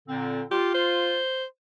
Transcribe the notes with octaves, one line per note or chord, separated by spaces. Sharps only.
A#2 D3 C4
F4 G4
C5